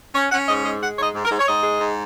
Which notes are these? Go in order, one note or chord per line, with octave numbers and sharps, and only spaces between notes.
C#4 C#5
C#4 F#5
G#2 D#5
G#3 D#5
G#3 F#5
G#2 C#5 D#5
G#2
A#4
G#2
C#5
G#2 D#5
G#3
G#2